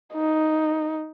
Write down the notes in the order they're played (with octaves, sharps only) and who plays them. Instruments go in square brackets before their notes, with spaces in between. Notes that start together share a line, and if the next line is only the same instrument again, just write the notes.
[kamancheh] D#4